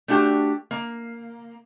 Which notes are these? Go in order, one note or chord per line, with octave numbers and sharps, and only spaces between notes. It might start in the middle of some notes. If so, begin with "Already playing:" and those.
A3 D4 F#4 G4
A#3